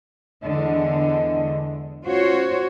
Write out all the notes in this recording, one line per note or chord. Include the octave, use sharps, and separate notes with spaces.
E2 D3 G#3 D#5
C#4 F4 F#4 C5 C#5